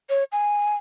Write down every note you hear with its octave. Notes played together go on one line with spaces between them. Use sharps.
C#5
G#5